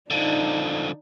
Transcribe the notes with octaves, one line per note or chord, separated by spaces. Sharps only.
D3 F3 D4 D#4